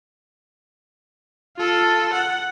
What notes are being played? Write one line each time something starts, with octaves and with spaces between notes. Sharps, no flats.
F4 A4
F#5